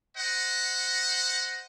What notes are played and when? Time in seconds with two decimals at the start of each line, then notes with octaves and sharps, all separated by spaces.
0.16 C5 D#5 F#5